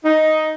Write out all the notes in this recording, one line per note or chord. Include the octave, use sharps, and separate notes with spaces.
D#4